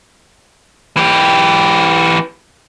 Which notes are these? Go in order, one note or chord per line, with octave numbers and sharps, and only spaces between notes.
E3 G4